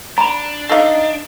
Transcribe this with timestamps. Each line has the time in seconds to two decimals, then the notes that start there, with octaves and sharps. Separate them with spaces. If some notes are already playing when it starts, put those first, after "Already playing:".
0.18 D4 A#5 B5
0.69 D#4 A4 F5